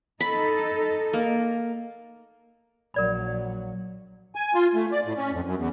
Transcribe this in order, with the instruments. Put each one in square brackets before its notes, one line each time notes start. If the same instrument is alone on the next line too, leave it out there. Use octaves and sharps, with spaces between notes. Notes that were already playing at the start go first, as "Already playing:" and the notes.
[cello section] D#4 A4 [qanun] B5
[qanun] A#3
[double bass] A#1 F#3 [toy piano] A#4 D5 B5
[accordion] G#5
F4
A3
D5
A2
C#4
F2
F#2
E2